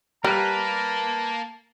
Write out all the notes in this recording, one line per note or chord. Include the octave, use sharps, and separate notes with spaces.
G3 A#3 A#4 B4 A5